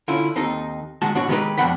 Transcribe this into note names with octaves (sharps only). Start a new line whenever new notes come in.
D3 C#4 E4 F4
D#2 C4 D#4 A4
D#3 G#3 F#4 A5
G#2 B2 D4 F#4 C#5
D#3 G3 G#3 D#4 G4 B4
F2 B2 D4 F#5 G5 B5